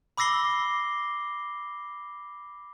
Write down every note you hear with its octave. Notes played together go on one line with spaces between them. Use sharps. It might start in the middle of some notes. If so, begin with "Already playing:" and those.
B5 D6 E6 A#6 C7 G7